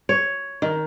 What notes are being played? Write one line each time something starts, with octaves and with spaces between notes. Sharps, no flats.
C#5
D#3